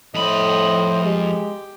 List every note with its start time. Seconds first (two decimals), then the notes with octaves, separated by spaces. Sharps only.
0.15 F2 A2 C5 D#5 B5
1.04 G#3 G4